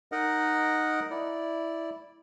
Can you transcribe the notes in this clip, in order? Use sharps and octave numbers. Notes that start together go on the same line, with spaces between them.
D#4 A#4 D#5 F#5
E4 D5